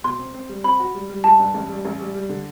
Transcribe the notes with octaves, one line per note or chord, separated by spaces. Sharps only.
B2 C6
C4
C4
G3
C4 B5
F#4
G3
G3
G3 A5
G2
A1
G3
A1
G3
G3
D3